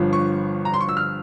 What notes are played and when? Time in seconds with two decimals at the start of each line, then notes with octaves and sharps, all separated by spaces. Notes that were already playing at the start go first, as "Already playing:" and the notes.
Already playing: G1 G2 F3
0.13 C#6
0.65 A#5
0.74 C6
0.81 C#6
0.89 E6
0.97 F6